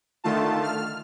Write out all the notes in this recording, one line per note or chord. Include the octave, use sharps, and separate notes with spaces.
D3 D#3 A3 F4 A5
F6